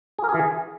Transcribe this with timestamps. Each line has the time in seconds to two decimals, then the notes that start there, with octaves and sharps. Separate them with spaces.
0.19 G#4
0.24 A#4
0.29 G#4
0.34 E3
0.39 G#4